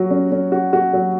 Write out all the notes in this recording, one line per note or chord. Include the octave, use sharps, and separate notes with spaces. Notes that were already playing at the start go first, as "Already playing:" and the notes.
Already playing: F#3 F#4
C#4
C#4
F#4
F#4
F#3